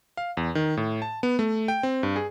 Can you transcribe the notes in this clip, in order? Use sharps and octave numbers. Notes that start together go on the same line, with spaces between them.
F5
E2
D#3
A2
A5
B3
A3
G5
C4
G2
G#4